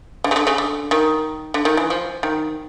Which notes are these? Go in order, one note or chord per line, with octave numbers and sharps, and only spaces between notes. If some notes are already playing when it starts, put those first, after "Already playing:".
D3
C#3
D3
C#3
D3
D#3
D3
D#3
E3
F3
D#3